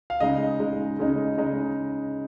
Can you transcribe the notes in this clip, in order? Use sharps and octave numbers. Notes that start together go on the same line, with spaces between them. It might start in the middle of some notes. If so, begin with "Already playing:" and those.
F5
C#3 G#3 D#4 D#5
C#3 G#3 D#4
C#3 G#3 D#4
C#3 G#3 D#4